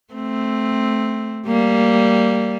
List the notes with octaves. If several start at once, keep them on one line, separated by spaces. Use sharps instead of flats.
A3 C4
G3 A#3